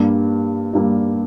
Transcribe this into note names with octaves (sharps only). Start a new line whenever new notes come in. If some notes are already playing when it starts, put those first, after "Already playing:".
Already playing: G2 G3 A#3
G2 G3 A#3